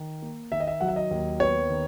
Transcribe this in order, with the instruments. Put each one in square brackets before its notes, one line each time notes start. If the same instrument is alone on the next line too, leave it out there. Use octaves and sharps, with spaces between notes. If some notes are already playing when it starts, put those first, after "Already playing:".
Already playing: [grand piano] D#3
A#3
D#3 E5
D#5
E5
F#3 F#5
E5
D#5
D#2
B3 C#5
D#3